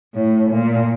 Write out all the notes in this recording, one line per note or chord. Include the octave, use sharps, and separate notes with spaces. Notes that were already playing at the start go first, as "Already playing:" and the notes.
A2
A#2